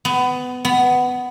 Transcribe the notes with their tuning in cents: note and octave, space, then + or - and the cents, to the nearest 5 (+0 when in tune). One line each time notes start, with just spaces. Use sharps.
B3 +20
B3 +10